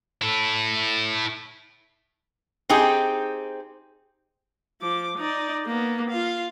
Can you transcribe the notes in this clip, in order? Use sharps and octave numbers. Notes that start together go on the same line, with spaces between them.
E4 A4
C4 D#4 G4 G#4
F3 D6
D#4 D5
A#3 B3
F4 F5